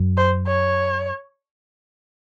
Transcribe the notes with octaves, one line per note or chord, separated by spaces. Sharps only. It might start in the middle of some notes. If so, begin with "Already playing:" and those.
Already playing: F#2
C5
C#5